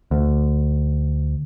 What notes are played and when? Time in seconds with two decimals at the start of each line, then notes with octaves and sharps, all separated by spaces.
0.11 D2